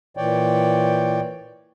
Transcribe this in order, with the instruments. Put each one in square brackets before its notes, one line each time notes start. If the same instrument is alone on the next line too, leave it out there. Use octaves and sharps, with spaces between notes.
[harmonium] A#2 E3 C#5 D5 G5